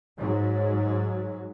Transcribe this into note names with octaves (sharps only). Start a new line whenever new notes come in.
G#2 F#3